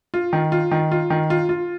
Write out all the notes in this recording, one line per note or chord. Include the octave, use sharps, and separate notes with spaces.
F4
D#3
F4
D#3
F4
D#3
F4
F4